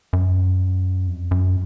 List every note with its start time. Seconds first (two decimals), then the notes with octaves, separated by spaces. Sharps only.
0.13 F#2
1.07 F2
1.31 F#2